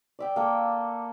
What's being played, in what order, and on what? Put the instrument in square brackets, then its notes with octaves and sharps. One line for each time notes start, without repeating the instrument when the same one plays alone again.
[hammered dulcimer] D5 E5 G5
A#3 A4